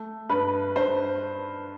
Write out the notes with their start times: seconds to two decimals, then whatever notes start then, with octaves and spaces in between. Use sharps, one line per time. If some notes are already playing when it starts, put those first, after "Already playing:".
Already playing: A3
0.29 G2 B4
0.76 G2 C5